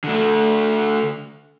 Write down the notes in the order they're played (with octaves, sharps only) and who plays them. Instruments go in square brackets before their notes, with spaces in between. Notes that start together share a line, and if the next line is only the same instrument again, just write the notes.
[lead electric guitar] D3 A3